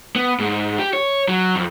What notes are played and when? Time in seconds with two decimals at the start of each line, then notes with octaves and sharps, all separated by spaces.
0.16 B3
0.39 G#2
0.79 G4
0.93 C#5
1.28 F#3
1.56 F2